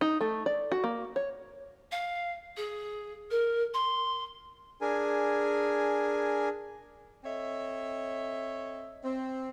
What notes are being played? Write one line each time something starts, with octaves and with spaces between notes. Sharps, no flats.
D#4
A3
D5
F#4
A#3
C#5
F5
G#4
A#4
C6
D4 G#4 A#4 G#5
C4 A4 C#5 D#5 E5
C4